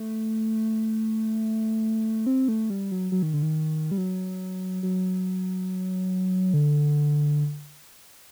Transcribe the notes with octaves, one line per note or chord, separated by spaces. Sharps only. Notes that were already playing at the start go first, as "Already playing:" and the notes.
Already playing: A3
C4
A3
G3
F#3
F#3
D#3
D3
D#3
G3
F#3
F#3
D3